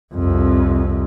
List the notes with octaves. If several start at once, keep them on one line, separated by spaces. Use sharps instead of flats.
C2 F2